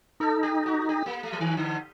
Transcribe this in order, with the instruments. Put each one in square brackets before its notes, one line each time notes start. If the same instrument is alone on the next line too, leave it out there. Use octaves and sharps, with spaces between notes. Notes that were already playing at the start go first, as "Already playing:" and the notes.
[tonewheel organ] D#4 [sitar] A4
[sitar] G4
F#4
G4
A#3
A3
F#3
D#3
D3